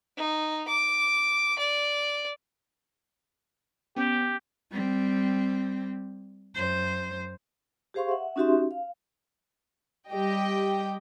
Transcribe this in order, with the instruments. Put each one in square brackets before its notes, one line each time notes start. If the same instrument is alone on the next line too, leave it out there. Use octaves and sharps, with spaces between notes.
[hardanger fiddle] D#4
D6
D5
[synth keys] B3 C#4 [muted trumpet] G4
[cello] G3 C4
F#2 C5
[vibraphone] G4 G#4 C5 F5 C6 C#6
E5 F#5
C#4 D#4 F#4 G4 E5 C6
F5
[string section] G3 G4 D#5 G5